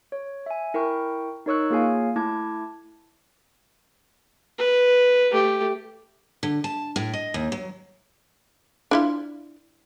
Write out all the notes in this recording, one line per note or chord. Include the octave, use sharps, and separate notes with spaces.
C#5
E5 G#5
E4 A#4 G5 C#6
D#4 A#4 C#5 C#6 E6 F#6
A#3 F4 G#4 C#5 F5 G#5
A3 E4 A5 D6 G#6
B4
A3 G4
D3
A5
A2
D#5
D#2
F#3
D4 E4 F4